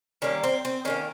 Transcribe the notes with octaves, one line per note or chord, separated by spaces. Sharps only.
D#3 G3 A#3 C#4
C4
C4
D#3 G3 A#3 C#4